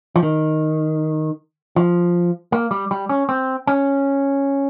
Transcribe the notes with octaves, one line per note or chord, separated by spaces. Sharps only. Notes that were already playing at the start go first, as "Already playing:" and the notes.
F3
D#3
F3
A#3
G3
G3
C#4
C4
C#4